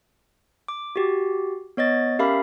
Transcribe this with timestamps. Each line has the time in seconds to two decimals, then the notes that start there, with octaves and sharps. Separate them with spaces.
0.68 D6
0.96 F#4 G4
1.77 B3 C#5 D#5 A6
2.19 C#4 G4 A#4 E5 F5 B5